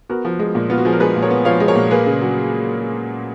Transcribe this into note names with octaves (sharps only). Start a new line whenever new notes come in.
B3 F#4 A#4
F3
G#3
A#2
B3 F4
F#4
F3 G#4
A#4
G#3 G#4 B4
A#2
A#4 C#5
B3
F3 C#5 F5
G#3
A#4 C#5
A#2
A#3 G#4 B4
C#3
F#3